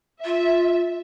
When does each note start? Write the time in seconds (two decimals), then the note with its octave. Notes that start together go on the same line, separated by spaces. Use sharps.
0.25 F4 E5